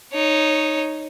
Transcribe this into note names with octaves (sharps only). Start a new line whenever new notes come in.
D#4 C#5